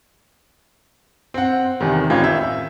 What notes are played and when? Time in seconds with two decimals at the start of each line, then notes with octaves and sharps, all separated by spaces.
1.34 C4 F#5
1.80 E2 C3 D#3
2.10 A1 D#3 C4 F4 G#6
2.24 E5